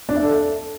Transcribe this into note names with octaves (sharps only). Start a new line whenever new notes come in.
D4
E5
A4